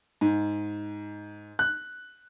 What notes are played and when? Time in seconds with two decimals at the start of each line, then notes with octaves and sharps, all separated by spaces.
0.21 G#2
1.59 F#6